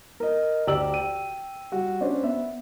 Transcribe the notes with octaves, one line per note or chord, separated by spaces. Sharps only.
A#4 D#5
D2 G4 D5 A#5 E6 F#7
G5 D#7
G3 F#4
C#4 D4 C5
B3 E5